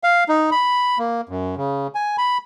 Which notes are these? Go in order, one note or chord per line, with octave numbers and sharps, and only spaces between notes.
F5
D#4
B5
A#3
F#2
C#3
G#5
B5